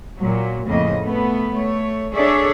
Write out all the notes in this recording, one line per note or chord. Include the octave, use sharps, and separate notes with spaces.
A#2 F#3
F2 A2 C#3 A#3 D#5
A3 B3
A3 C#5
D4 G#4 A4 C#5 D5 E5